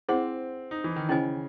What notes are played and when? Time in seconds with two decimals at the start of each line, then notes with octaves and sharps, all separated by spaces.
0.08 C4 E4 G#4 C5 F#5 C6
0.71 D#4
0.84 E3
0.96 D#3
1.09 C#3 C#4 E4 C5 D#5 G#5